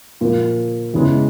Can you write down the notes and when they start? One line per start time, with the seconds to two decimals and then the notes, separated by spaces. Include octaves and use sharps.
0.21 A#2 F3 A#3
0.93 E2 C#3 E3 G#3